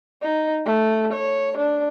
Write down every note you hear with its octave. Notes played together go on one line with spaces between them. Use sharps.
D#4
A3
C#5
D4